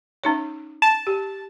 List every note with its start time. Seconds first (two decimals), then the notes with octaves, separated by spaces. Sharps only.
0.24 C#4 D#4 C#5
0.82 A5
1.07 G4